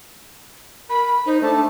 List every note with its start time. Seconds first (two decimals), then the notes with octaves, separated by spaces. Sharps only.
0.90 A#4 B5
1.26 D#4 C5
1.42 A3 D4 A5